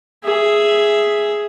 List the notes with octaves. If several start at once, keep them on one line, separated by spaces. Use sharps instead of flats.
G#4 E5